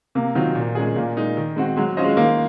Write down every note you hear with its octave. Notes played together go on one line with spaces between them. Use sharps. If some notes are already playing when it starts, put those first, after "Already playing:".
C3 A#3
D#3 F#3 C4 F4
A#2
G#3 C#4 G#4
A#2 A#3
G#3 D#4
D#3
G#3 C4 F#4
F#3 G#3
C#4 F4 C5 D#5
G#3
D#3 A#3